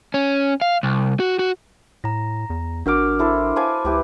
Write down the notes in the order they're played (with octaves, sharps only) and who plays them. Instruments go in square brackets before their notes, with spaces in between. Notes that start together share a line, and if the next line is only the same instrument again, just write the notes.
[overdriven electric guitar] C#4
F5
C2
F#4
F#4
[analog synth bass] A2 [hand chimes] A#5 A#6
[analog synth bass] E2
[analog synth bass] G#1 [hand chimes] D4 A#4 F6 [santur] F#4 D6
[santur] E4 A4 C5
[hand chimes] C5 A5 D6 [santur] F5 G#5 B5
[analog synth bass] C#2 [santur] E4 G4 B4